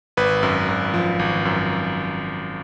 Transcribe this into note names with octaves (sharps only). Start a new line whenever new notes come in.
G#1 B4
F#2
G#1
F3
G#1
F#2